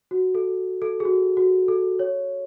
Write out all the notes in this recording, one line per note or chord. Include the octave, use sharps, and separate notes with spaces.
F#4
A4
A4
G#4
F#4
F#4
A4
C#5